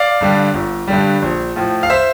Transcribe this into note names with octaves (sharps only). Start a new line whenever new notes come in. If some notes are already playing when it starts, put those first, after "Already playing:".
Already playing: D5 F5
G2 D3 G3
G1
G2 D3 G3
A#1
A2 F3
F5
C5 E5